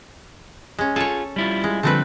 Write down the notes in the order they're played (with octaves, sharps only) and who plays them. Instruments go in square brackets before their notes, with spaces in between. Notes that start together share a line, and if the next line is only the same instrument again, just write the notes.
[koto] G#3 C#4
[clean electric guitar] F4 G#4 [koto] A4 C#5
[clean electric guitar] G3 E4 F4
[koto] G#3
[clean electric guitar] D3 F3 G3 [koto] A3 C4 B4